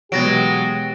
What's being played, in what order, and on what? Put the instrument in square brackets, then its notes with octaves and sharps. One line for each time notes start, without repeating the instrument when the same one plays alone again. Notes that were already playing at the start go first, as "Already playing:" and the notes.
[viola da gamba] B2 E3 G#3 [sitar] F#3 [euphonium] G4 [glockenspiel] A6 A#6 D7